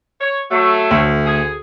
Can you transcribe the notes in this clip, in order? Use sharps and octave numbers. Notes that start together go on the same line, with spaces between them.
C#5
F#3 A3
D2
G#4